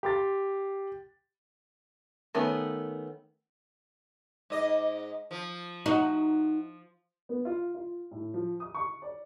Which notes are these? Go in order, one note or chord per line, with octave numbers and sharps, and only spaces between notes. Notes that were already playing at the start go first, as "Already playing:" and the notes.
G4 C6 A6
D#3 A3 B3 C#4
G#2 D#5
F3
D#4 F#4
B3
F4
F4
A2
F3
D#6
C#6
D5